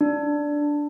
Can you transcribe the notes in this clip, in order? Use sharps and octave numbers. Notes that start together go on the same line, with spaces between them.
D4